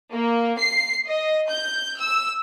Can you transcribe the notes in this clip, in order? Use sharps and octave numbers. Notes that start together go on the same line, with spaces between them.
A#3
C7
D#5
G6
E6